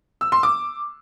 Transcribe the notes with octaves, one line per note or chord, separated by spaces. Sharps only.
E6
C6
D6